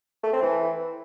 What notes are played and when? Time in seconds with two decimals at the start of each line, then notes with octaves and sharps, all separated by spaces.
0.24 A3
0.33 C4
0.42 E3